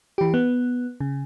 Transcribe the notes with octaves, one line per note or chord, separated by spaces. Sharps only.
E3 G4
B3
C#3